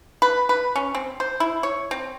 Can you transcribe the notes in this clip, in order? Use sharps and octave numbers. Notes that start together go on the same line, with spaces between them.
B4
B4
C#4
C4
C5
E4
C#5
C4